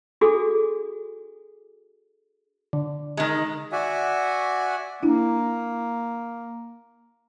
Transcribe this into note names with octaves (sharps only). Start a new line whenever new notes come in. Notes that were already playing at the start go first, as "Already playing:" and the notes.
D4 F#4 G#4 A4
D3
D#3 G#3
F#4 D5 E5 F#5 G#5
A#3 D4 E4